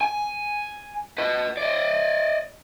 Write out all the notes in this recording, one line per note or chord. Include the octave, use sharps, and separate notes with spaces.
G#5
B4 D#5
D5 D#5